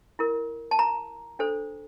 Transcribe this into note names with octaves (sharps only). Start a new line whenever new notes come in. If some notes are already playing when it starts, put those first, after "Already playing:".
E4 A#4
A5
A#5
D4 A4 C5